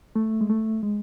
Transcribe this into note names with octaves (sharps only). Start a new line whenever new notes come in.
A3
G#3
A3
G#3